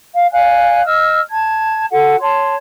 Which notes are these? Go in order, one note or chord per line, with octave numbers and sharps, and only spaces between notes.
F5
D5 F5 G#5 F#6
D#5 E6 F6
A5 G#6
F#4 A4 F#5
C#5 A5 C6